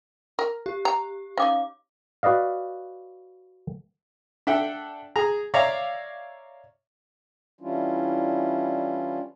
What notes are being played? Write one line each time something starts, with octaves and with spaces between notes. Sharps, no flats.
A#4
G4
A#5
C#4 D#4 F5 D6
F#4 B4 D5 D#5 F5
D4 A4 E5 F#5 G5
G#4 A#5
C#5 D5 E5 F5 A#5
E3 G3 C#4 D4 E4 F4